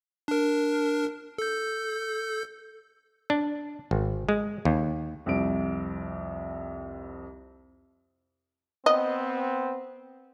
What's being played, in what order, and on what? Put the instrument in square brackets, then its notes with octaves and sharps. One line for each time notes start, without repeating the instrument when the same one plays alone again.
[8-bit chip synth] D4 A#4
A4 G6
[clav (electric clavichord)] D4
G#1
G#3
D#2
[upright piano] C2 F2 D7
[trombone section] B3 C4 [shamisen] D#5